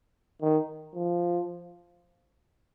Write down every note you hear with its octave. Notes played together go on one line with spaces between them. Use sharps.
D#3
F3